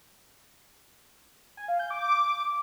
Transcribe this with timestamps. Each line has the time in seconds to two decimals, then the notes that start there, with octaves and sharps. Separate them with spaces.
1.57 G#5
1.68 F5
1.79 G6
1.90 D6